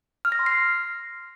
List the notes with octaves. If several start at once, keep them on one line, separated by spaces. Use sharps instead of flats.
F6
A#6
C6
C7